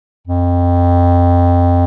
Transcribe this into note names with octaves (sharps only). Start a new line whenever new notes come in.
F2